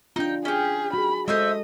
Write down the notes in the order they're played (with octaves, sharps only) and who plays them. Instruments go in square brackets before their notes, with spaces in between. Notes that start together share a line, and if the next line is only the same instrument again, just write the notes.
[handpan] D4 F4 [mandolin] D#4 G5
[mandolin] C#4 G4 [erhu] G#4
[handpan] F#4 G#4 [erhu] B5
[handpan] G#3 A4 [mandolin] C5 C#5 E5 [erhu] D#5